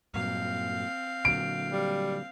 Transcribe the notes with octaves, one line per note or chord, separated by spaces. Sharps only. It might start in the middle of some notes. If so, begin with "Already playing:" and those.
G2 A#2 F#3 C4 F5
A#2 D3 F#3 D7
G3